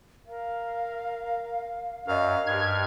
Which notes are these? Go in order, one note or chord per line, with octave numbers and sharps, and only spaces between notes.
A#4 F5
F#2 A#4 D#5 F5
G2 G4 F6 G#6